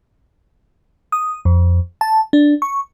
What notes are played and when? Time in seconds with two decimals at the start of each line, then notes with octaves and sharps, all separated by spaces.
1.12 D#6
1.45 F2
2.01 A5
2.33 D4
2.62 C#6